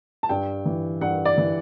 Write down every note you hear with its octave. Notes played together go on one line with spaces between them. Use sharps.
A5
G2 G5
E3
G2 F#5
D5
E3